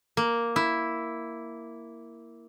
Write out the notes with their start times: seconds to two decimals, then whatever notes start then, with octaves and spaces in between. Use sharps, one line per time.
0.17 A#3
0.56 E4